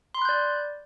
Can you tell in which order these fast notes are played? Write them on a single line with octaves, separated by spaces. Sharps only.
C6 B5 F#6 G6 D5